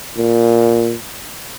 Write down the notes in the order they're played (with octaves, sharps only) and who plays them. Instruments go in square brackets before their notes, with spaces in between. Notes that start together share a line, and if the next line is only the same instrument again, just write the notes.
[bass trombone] A#2